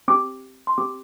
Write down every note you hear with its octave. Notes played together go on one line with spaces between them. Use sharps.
C4 G4 D6
C6
C4 G4 D6